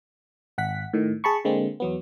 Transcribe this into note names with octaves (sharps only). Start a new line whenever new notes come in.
G#1 F#5 B6
A2 D#3
G#4 A5 B5 C#6
D3 G#3 A#3 C4
E2 F#3 B3